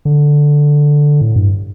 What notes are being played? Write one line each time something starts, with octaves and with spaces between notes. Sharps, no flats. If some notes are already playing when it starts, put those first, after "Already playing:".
D3
A2
G2